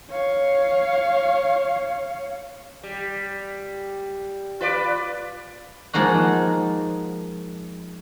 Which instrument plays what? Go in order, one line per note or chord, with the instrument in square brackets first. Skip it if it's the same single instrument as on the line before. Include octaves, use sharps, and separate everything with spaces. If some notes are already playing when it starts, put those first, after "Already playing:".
[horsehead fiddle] C#5 F5
[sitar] G3
F4 B4 D5
[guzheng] F3 G#3 A#3 D#4 F#4